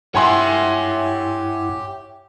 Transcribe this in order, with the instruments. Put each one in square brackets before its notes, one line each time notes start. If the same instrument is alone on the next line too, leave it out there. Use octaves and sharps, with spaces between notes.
[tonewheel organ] G2 E4 [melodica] G4 [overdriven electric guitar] C#5 E5 [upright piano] F#5 G#5 C6